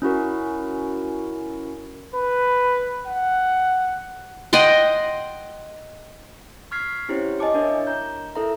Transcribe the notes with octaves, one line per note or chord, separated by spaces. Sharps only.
C#4 E4 F#4 A#4
B4
F#5
D#5 F#5 G5 C6
C#6 F6 G#6 B6 C7
C4 C#4 E4 G4 C5 C#5
D#5 G#5 A5 D6 C#7
D4 E4 A#4 C#5 E5
A#5 G6
E4 A4 A#4 E5 A#5